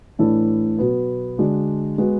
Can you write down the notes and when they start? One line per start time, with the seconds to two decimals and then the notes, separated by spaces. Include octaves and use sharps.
0.19 A2 E3 A3 D4 A4
0.78 B2 F#3 B3
1.38 D3 G#3 D4 F#4
1.98 G#3 B3 F#4